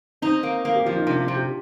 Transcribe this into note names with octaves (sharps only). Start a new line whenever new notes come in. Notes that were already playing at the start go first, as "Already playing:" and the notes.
C4 D#4
A#3
A#3
G4
F3 F4
D#4
C3 D4
F4
C3
G4